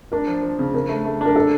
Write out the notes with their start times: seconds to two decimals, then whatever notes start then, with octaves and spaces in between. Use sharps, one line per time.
0.12 D4 A#4
0.27 F3
0.43 F3
0.59 C#3
0.74 C#3 A#4
0.89 A3
1.05 A3
1.21 D4 A#4
1.36 A4